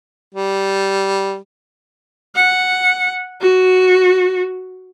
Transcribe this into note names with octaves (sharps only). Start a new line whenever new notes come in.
G3
F#5
F#4